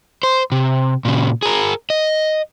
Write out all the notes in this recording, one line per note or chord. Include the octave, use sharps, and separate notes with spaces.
C5
C3
A#2 C#3
G#4 A#4
D#5